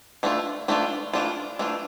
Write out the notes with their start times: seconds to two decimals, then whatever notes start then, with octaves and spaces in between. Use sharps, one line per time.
0.23 E3 A3 D4 F4
0.68 E3 A3 D4 F4
1.13 E3 A3 D4 F4
1.59 E3 A3 D4 F4